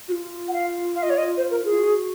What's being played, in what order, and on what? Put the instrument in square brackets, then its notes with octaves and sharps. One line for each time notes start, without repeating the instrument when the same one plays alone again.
[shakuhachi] F#4
F4
[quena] F#5
F5
F5
D#5
C#5
D#5
C5
A#4
G#4
[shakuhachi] F4
F#4